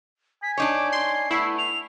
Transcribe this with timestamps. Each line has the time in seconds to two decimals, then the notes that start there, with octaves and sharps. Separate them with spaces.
0.43 G#5 B6
0.57 D4 D#4 C#5 D6
0.92 C6 C7
1.31 A3 B3 E4
1.58 F7